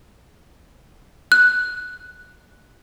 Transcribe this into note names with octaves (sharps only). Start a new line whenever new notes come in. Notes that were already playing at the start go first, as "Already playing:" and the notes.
F#6